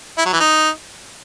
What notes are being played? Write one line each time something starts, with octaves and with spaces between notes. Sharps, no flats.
E4
F#3
E3
D#4